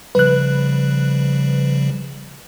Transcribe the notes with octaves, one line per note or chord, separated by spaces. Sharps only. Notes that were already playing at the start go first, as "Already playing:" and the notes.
C#3 F3 G3 B4 F#6